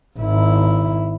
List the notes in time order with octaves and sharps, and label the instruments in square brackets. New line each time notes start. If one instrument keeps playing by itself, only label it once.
[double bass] G#1 E4